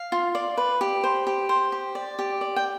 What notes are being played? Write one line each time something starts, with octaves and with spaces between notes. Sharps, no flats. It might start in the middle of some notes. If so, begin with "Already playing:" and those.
Already playing: F5
F4
D5
B4
G4
C5
G4
C5
G4
D5
G4
D5
G5